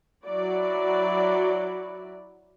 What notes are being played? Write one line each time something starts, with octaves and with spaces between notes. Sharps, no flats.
F#3 E4 F#4 D5